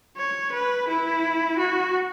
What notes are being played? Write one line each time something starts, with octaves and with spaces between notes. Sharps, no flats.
C#5
B4
E4
F#4